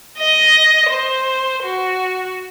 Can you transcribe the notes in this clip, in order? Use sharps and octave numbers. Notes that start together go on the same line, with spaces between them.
D#5
C5
F#4